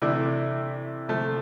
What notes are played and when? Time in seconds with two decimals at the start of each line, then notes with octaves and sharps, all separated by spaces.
0.02 C3 E3 A3 D4 E4
1.08 C3 F3 A3